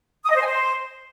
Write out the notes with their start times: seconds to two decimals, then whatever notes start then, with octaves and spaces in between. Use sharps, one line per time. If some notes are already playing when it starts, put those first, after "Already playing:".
0.24 D#6
0.30 D#5
0.35 C5
0.41 G#5
0.47 C5